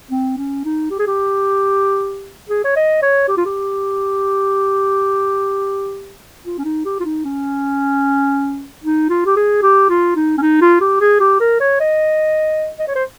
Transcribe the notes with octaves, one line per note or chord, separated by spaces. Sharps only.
C4
C#4
D#4
G4
G#4
G4
G#4
C#5
D#5
C#5
G4
F4
G4
F4
C#4
D#4
G4
F4
D#4
C#4
D#4
F4
G4
G#4
G4
F4
D#4
C#4
D#4
F4
G4
G#4
G4
A#4
C#5
D#5
D#5
C#5
C5